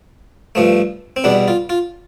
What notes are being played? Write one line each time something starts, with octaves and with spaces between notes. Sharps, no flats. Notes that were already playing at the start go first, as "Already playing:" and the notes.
G2 F3 A3
C4
E2 B2 G3 D4
F4
F4